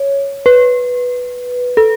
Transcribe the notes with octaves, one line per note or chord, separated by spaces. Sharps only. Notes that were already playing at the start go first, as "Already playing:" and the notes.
Already playing: C#5
B4
A4